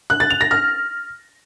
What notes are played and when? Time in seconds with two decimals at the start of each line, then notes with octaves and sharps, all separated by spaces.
0.10 F#6
0.20 A6
0.30 F7
0.41 A#6
0.51 F6